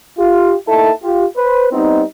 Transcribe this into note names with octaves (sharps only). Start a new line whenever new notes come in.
F4 G4
A#3 D#4 E4 A4 E5 A5
F4 G4
B4 C5
G3 B3 C4 D#4